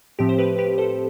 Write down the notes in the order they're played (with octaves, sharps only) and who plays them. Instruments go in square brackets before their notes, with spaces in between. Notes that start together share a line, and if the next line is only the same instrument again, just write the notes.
[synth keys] A2 F3 C4 G4
C5
G4 B4
G4 B4
A4 C5